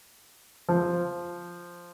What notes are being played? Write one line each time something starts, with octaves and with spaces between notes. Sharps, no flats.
F3